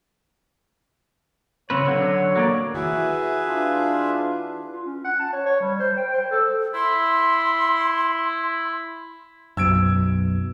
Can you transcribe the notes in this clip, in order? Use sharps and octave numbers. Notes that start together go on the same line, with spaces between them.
C#3 C4 B4 C#5
D3 F#3
F#3 A#3 D5
E3 F#4 G#4 B4 E5
D4 F4
F4
C#4
F#5
A5
C#5
C#5
G3
C5
G5
C5
A4
E4 C6
B1 F#2 B2 E6 G#6 D7